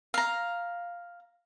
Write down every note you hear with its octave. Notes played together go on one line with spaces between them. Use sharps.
F5 A#5